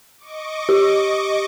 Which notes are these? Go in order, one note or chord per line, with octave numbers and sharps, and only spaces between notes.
D#5 C#6 D6
G4